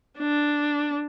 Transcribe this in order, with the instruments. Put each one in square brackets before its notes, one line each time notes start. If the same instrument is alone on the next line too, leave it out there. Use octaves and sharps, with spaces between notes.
[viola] D4